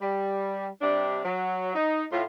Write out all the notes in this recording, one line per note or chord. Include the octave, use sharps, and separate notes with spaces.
G3
C3 G3 D4
F#3
D#4
A2 F4